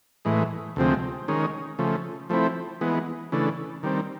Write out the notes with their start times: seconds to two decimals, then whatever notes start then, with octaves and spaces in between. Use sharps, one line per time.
0.25 A2 E3 G#3
0.76 D2 C3 F3 G#3 C4
1.28 D#3 G#3 C#4
1.79 C#3 F3 A3
2.29 F3 A3 C4 E4
2.81 E3 G#3 B3
3.32 C#3 E3 A3 D4
3.83 D#3 G3 C4